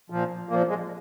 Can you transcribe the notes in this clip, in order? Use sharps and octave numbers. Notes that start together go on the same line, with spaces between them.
A#2 F3
A#2 F3 A#3
G#3